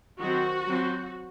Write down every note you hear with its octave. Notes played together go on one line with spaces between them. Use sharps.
D#3 F#3 C4 F#4
F#3 C4